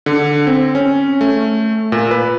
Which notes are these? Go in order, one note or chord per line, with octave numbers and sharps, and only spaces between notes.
D3
C4
C#4
A3
A#2
B4